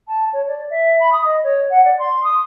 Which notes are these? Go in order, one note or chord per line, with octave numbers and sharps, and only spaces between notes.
A5
C#5
D5
E5
B5
D#6
D#5
C#5
F#5
D5
C6
D#6